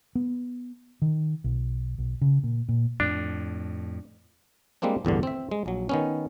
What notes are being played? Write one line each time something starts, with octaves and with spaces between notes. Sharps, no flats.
B3
D#3
B1
B1
C#3
A#2
A#2
F2 A2 D4
G3 G#3 A#3 C4 D4
A1 E2 G2 D3
C4 E5
G#3
A#1 F#3
D#3 B3 C#4